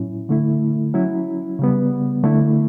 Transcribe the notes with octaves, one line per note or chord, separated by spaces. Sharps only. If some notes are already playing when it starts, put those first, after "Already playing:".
Already playing: A2 F#3 C#4 E4
D3 A3 E4
F#3 C#4 E4
C#3 G3 B3
D3 A3 E4